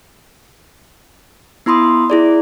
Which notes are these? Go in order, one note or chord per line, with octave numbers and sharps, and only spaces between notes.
B3 E4 B5 C6 D#6
E4 G#4 D5